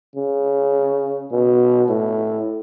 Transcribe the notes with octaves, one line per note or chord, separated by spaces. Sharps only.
C#3
B2
A2